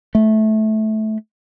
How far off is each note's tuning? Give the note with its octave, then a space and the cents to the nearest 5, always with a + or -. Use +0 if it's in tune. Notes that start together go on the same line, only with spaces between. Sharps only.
A3 -15